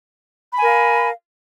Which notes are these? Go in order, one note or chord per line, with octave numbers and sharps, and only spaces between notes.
A#4 F5 G#5 B5